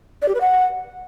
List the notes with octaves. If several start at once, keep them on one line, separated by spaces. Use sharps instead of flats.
D5
G4
B4
F#5